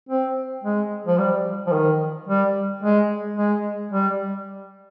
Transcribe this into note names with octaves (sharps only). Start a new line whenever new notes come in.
C4
G#3
F3
G3
F3
D#3
G3
G#3
G#3
G3